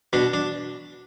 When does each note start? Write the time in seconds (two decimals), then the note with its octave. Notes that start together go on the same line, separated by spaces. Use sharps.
0.13 B2 D4
0.34 D4